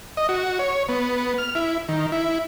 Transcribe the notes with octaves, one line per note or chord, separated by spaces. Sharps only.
D#5
F#4
C#5
B3
F6
E4
D#3
E4